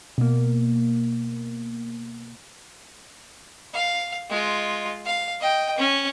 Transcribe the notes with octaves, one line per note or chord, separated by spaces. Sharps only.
B2 A#3
F5
G#3 F4
F5
D#5 G5
C#4